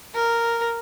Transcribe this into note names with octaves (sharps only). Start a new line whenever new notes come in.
A#4